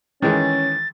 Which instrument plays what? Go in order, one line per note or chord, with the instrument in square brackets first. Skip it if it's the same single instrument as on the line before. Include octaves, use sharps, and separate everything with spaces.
[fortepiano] D#3 E3 G#3 [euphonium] C#4 [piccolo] A6